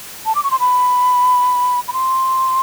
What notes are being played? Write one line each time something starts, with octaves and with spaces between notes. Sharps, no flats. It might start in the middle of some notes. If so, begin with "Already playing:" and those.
A5
D6
C#6
C6
B5
B5
C6